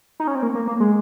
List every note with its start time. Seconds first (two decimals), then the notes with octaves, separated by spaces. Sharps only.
0.20 D#4
0.27 C#4
0.35 C4
0.42 A#3
0.55 A#3
0.68 A#3
0.80 G#3